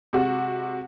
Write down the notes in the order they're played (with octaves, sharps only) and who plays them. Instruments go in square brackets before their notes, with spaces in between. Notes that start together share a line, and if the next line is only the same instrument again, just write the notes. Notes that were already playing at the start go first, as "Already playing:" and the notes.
[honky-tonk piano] C3 G#3 F#4